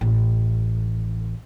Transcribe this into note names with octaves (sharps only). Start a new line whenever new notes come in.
A1